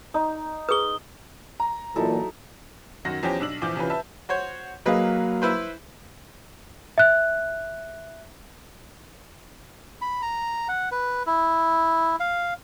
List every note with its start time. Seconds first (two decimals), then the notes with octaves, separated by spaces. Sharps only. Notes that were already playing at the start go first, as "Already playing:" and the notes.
0.14 D#4
0.69 G#4 B4 D#6 G7
1.60 A#5
1.96 A#2 E3 F#3 D#4 E4 A4
3.05 F#2 D#3 F#4 A#6
3.23 E2 F3 C#4 G4 G5 A#6
3.40 B1 D4 E6 F#7
3.61 A#1 E3 F3 D6 G6
3.76 C3 E3 C#4 F4 B4
3.90 B4 E5 A5
4.29 F#4 C5 C#5
4.86 F#3 A#3 G#4 B4 D#5 F5
5.42 E4 B4 C5
6.98 E5 F#6
10.02 B5
10.22 A#5
10.69 F#5
10.92 B4
11.26 E4
12.20 F5